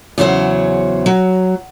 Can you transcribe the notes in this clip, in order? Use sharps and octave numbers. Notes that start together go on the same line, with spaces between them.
E2 C#3 F#3 C5 C#5
F#3